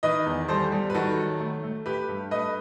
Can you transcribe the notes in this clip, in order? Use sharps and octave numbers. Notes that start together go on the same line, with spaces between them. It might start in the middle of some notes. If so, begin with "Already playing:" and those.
D#3 B4 D#5
E2
G3 A4 C5
G3
B4
D#3 F#4 A4
F#3
A3
A3
A3 G4 B4
G2
A3 B4 D#5